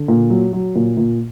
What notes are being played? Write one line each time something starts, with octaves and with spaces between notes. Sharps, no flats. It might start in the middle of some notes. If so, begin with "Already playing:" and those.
Already playing: D3
A#2
F#3
F#3
A#2
A#2